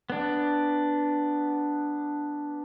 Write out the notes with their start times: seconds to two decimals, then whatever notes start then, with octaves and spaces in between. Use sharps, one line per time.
0.10 B3 D4